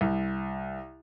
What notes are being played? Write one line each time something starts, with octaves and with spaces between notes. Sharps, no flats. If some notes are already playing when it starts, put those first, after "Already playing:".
C2